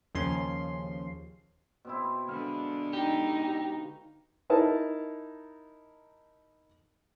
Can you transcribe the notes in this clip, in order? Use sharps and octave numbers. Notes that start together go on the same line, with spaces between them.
D#2 C#3 F3 C#4 C6
B2 C4 E4
D3 G#3 F5 B5
D#4 G4
D#4 E4 A#4 A5